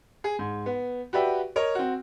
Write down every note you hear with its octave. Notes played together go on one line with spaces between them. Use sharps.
G#4
G#2
B3
F#4 G4 B4 D5 E5 G5
A#4 C#5 D#5
C4 F#4